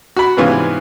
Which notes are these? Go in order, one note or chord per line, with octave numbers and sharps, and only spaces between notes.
F#4 B5
G#2 C3 E3 B3 C#4 F4